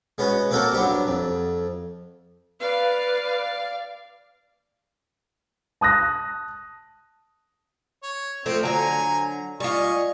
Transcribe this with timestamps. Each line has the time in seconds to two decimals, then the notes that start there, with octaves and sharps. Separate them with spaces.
0.18 G#3 B3 C#4 F#4
0.51 A#3 C4 F#4 A4 A#4 G5
0.73 F#3 B3 D4 G4
1.07 F2
2.60 B4 D5 F5
5.81 A5 D#6 F#6 A#6
8.03 C#5
8.46 F3 A3 C4
8.63 D3 F#3 G#5 A#5
9.60 G3 F4 D#5 G#5 C#6